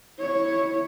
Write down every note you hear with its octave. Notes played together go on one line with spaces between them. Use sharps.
E4 C#5